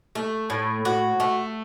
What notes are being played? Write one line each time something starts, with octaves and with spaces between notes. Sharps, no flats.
A3
A2
F#4
A3